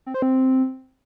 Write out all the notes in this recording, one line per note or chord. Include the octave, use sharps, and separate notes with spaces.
C4
C5
C4